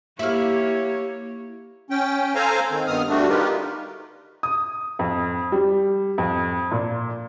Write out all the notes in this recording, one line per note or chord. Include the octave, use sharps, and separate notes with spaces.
A#3 E4 G4 C#5 F5
C#4 G5
A4 C5 F5 G#5 A#5
D#3 C4
G2 D#3 B3 D#6 F6
D3 G3 A3 D4 F#4
D#4 F4 G4 A#4 B4
D#6
F2
G3
F2
A#2